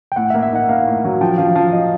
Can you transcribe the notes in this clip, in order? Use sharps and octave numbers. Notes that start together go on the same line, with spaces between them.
G5
A2 F#5
E5
A#3
E5
D#4 F#5
A#3 F5
A2
F#3
F3 G5
F3 F5
F3 F5
D#5